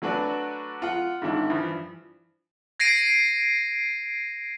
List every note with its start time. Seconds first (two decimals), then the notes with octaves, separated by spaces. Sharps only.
0.02 F#3 A3 D4 F#4 B4 D5
0.82 F4 F#5
1.22 G#2 D#3 D4 E4
1.50 G2 E3 F3
2.80 G#6 A#6 C7 D7 D#7